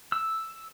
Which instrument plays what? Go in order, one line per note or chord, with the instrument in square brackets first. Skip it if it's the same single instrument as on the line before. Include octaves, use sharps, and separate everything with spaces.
[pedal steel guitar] E6